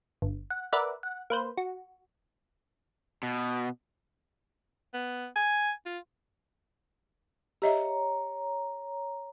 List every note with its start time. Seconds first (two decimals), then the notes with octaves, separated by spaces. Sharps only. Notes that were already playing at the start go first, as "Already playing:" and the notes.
0.22 G1
0.50 F#5
0.73 A#4 B4 D5 E5 F#5
1.03 F#5
1.30 A#3 B4 C5
1.57 F#4
3.23 B2
4.94 B3
5.36 G#5
5.86 F4
7.62 G4 C#5 D#5 E5 A#5